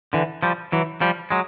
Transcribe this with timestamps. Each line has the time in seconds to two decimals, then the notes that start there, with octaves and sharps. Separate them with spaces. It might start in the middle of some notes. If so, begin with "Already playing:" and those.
0.13 D3 E3
0.43 F3 G3
0.72 E3 F#3
1.01 F3 G3
1.31 F#3 G#3